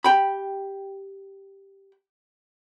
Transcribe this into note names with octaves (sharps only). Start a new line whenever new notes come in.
G4 G5 B5